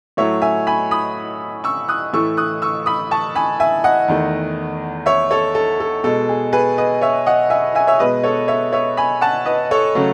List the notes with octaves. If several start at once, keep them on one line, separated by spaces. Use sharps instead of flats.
A2 F#3 A3 C#5 E5
E5 G#5
G#5 B5
B5 D#6
C#6 E6
D#6 F#6
A2 E3 A3 C#6 E6
D#6 F#6
C#6 E6
B5 D#6
A5 C#6
G#5 B5
E5 G#5
D#5 F#5
E2 D#3 A3
C#5 E5
A4 C#5
A4
A4
B2 G#3 A4
G#4
G#4 B4
B4 D#5
C#5 E5
D#5 F#5
E5 G#5
E5 G#5
C#5 E5
B2 G#3 B4 D#5
A4 C#5
C#5 E5
C#5 E5
G#5 B5
F#5 A5
B4 D#5
A4 C#5
C#3 F#3 A3